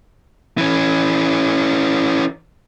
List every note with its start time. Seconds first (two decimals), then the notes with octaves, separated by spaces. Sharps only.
0.58 E3 C#4